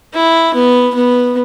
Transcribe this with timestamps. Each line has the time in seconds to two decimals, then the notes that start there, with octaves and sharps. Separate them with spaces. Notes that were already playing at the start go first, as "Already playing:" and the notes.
0.14 E4
0.54 B3
0.95 B3